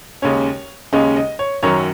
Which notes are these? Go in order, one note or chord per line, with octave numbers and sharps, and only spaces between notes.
D#2 C#3 G#3 C#4 C#5
D#2 C#3 G#3 C#4 D#5
D#5
C#5
F#2 D#3 F#3 C#4 C#5